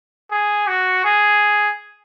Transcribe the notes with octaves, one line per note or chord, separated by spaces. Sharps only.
G#4
F#4
G#4